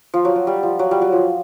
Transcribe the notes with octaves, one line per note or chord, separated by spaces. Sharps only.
F3
F#3
F#3
G3
F3
F#3
G3
F#3
F3